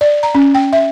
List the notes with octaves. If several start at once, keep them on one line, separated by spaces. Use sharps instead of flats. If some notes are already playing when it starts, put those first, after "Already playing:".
D5
A#5
C#4
G5
E5